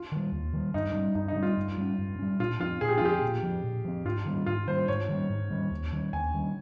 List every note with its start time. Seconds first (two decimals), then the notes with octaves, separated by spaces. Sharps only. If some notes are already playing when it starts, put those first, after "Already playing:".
Already playing: F4
0.12 D#3 G3
0.32 D#2
0.53 D#3 G3
0.74 G2 D#4
0.94 G3 C#4
1.15 G2 D#4
1.28 D#4
1.36 G3 C#4
1.43 F4
1.57 G2
1.78 G3 C#4
1.98 G2
2.19 G3 C#4
2.39 A#2 F4
2.60 F3 C4 F4
2.81 A#2 G#4
2.89 G4
2.98 F4
3.01 F3 C4 G4
3.22 A#2
3.43 F3 C4
3.63 A#2
3.85 F3 C4
4.05 G#2 F4
4.25 D#3 G3 C#4
4.46 G#2 F4
4.67 D#3 G3 C#4 C5
4.88 G#2 C#5
5.09 D#3 G3 C#4
5.30 G#2
5.50 D#3 G3 C#4
5.71 D#2
5.92 D#3 G3 C#4
6.13 D#2 G#5
6.34 D#3 G3 C#4